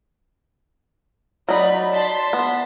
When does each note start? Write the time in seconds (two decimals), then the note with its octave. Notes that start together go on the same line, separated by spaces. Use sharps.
1.49 F#3 D#4 D5 B5
1.91 A5 C6 B6
2.33 B3